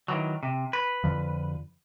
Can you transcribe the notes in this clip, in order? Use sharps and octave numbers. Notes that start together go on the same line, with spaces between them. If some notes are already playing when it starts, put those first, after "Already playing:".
D#3 E3 F#3
C3
B4
F2 D3 F3